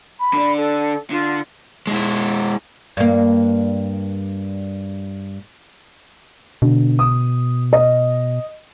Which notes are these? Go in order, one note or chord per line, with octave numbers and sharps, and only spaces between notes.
B5
D3 D4
A4
D3 F4
G#3 E4
G2 A#3
B2 D3
D#6
D#5